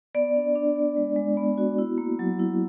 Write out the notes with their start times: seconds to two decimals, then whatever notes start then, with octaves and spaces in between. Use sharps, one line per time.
0.15 B3 D5
0.36 D4
0.56 D4
0.76 B3
0.96 G#3
1.16 G#3
1.37 B3
1.58 F#4
1.78 E4
1.98 A#3
2.19 F#3
2.39 E4